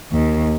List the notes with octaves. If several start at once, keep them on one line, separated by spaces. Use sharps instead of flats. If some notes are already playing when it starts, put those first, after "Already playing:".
D#2